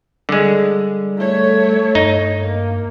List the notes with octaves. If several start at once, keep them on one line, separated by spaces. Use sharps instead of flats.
D3 G3 G#3
A3 C#5
G2 D#4
A#3